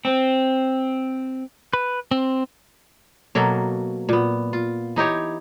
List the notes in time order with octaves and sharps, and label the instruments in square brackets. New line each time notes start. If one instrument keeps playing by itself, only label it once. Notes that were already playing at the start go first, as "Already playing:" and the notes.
[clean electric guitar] C4
B4
C4
[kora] B2 F#3 A#3 A4
A#2 B3
F4
E3 D#4 G4 C#5